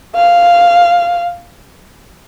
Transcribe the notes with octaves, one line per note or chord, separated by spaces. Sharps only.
F5